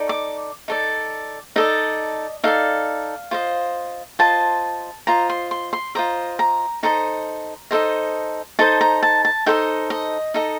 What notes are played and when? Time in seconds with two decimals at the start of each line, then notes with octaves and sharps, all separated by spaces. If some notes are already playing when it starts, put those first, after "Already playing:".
Already playing: D#4 A4 D5
0.09 D6
0.68 D#4 A4 D5
1.56 D#4 A4 D5 D#5
2.44 D#4 A4 D5 F5
3.31 F4 C5 D#5
4.19 F4 C5 D#5 A5
5.07 F4 C5 D#5 A#5
5.29 C6
5.51 C6
5.73 C6
5.95 F4 C5 D#5 A#5
6.39 A#5
6.83 D#4 A4 C5 D#5 A#5
7.71 D#4 A4 C5 D#5
8.59 D#4 A4 C5 D#5 A5
8.81 A#5
9.03 A5
9.25 A5
9.46 D#4 A4 C5 D#5 G5
9.90 D#5
10.34 D#4 A4 D#5